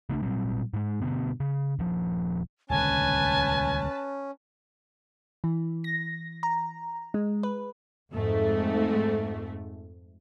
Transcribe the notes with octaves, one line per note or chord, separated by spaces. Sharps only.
C#3 A3 C#4 D4
A#2 F#3 G3 C4
G#2 G#3
G2 B2 D3 B3
C#3
D#1 F3
D#1 C#2 D3 C#4 B4 G#5 A5
E3
A#6
A#5
G#3
B4
F2 G#2 A3